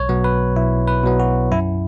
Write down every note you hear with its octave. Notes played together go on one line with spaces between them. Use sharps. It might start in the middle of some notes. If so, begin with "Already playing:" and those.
Already playing: B1 C#5
B2 F#3 B3
B4
B1 E4
B4
B2 F#3 B3
F#4
F#2 E4